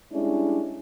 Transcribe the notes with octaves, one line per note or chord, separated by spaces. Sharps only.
G3 G#3 C#4 D4 E4